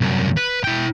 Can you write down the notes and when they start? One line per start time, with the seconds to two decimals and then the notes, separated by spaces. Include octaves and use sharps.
0.01 C2 F#2
0.37 B4
0.64 E4 G5